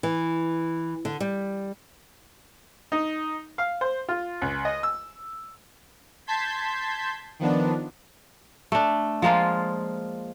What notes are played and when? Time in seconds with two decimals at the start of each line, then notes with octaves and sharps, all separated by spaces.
0.03 E3
1.05 D3
1.20 G3
2.92 D#4
3.58 F5
3.81 C5
4.09 F4
4.42 C#2
4.65 D#5
4.83 E6
6.27 A5 C6 G6 G#6 B6
7.39 D#3 F3 B3 D4
8.72 A3 D4
9.22 F3 G#3 A#3 F4